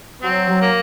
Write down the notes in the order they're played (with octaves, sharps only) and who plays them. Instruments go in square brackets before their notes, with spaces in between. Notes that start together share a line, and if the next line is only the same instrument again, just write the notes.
[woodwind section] F#3 [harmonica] C4
[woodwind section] F#3
[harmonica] A#3